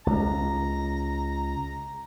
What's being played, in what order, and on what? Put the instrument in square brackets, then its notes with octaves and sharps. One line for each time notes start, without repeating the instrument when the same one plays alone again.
[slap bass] C#2 [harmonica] A#5